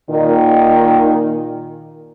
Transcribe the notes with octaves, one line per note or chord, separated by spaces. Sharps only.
A#2 D#3